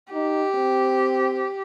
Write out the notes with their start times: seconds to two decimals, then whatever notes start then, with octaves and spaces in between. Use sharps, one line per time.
0.13 D#4 G4
0.55 C4